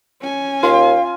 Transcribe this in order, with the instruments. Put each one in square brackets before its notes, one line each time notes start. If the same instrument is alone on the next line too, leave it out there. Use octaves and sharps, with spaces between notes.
[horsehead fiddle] C#4 G#5
[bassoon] D#2 [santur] F4 [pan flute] F5